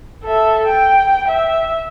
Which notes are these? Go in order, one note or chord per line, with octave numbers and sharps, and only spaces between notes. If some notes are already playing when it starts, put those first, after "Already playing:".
A4 E5
G5
E5